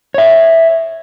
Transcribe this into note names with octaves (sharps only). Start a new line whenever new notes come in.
C#5 E5